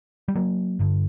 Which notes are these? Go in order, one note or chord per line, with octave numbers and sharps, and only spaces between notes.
G3
F#3 A#3
G1 G2 D3